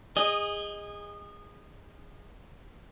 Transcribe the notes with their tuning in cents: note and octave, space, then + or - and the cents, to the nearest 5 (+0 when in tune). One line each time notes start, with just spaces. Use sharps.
G#4 -25 D#5 +0